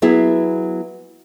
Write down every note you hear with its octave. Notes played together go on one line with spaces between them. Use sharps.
F#3 B3 E4 G#4